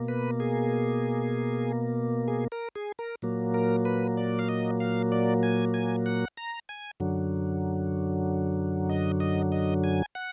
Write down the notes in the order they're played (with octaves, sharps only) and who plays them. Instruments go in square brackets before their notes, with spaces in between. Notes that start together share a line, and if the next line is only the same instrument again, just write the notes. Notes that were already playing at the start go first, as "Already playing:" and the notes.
Already playing: [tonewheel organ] B2 A#3
B4
G#4
G#4
A#4
G#4
A#4
A#2 F#3 A#3
A#4
B4
D5
F5
D#5
F5
D5
G#5
G#5
F#5
A#5
G#5
F#2 D3 F#3
D#5
D#5
D#5
G#5
F#5